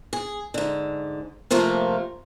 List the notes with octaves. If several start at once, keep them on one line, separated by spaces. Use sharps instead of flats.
G#4
G#2 D3
C3 F3 A3 A#3 F4